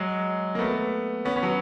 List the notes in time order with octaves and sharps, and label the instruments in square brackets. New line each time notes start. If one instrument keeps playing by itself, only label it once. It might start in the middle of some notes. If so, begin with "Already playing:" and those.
Already playing: [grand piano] F#3 G#3
A#3
A3 B3
B3 C#4
B3 C#4
F#3